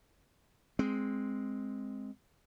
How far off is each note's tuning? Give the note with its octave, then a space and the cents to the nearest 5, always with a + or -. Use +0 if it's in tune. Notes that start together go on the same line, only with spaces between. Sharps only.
G#3 +0 C4 +0